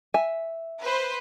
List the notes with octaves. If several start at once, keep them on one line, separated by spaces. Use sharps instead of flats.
E5 G#5
B4 C5